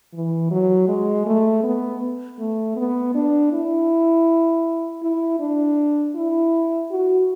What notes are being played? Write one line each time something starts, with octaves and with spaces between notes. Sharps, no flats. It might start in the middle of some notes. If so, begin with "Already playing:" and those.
E3
F#3
G#3
A3
B3
A3
B3
D4
E4
E4
D4
E4
F#4